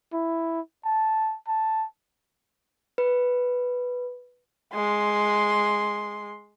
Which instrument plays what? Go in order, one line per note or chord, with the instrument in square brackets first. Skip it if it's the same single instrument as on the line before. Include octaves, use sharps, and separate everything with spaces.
[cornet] E4
A5
A5
[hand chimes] B4
[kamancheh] G#3 C6